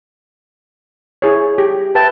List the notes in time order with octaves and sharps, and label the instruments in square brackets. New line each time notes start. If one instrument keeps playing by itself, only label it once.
[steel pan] E4 G#4 C#5
G4
[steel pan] B4 E5 G5 [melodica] A5